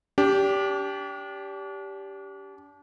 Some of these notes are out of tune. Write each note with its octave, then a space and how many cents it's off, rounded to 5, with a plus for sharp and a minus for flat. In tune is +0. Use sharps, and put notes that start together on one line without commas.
D4 -35 G4 +0